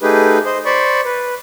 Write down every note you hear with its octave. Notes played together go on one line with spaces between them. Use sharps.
A3 D#4 G4 G#4 B4
C5 D#5
C5 D5 B5 C#6
B4